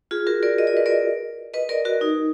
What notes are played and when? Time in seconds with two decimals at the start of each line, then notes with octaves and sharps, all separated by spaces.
0.11 F4 G#4
0.27 F#4 A#4
0.43 A#4 D5
0.58 D#5
0.67 D5
0.77 B4
0.86 A#4 D5
1.54 B4 D#5
1.69 A#4 D5
1.85 F#4 A#4
2.01 D#4